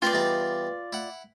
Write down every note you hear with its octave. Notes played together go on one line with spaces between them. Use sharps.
C4 F4 B4 C5 D5
E2 G3 D#4
E4 F#5